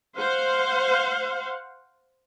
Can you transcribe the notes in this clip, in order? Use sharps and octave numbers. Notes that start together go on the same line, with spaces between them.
C5 F5 F#5